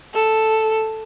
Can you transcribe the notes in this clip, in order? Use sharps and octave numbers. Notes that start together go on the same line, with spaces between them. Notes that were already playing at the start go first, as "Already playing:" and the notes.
A4